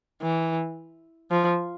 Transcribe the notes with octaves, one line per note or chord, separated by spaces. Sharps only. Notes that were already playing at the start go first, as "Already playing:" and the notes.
E3
F3